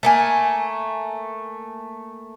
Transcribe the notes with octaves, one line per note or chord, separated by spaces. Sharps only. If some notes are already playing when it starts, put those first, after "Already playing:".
A3 A#3 G#5